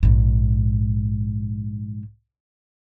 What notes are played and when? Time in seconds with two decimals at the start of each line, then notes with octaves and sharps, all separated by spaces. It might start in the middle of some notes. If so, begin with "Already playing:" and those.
0.03 A#1 G#2